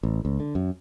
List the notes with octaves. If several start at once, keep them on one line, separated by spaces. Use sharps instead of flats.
A1
C#2
D3
F#2